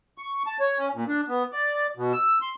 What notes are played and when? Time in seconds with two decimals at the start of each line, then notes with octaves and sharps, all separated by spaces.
0.18 C#6
0.47 A5
0.60 C#5
0.78 C#4
0.95 A#2
1.08 D4
1.28 B3
1.52 D5
1.97 B2
2.13 E6
2.42 C6